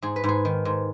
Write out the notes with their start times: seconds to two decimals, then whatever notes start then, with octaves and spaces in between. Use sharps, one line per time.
0.02 G#2 G#4
0.16 B4
0.24 G#2 G#4
0.45 D#3
0.65 G#2